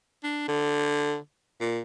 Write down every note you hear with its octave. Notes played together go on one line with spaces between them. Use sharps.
D4
D3
A#2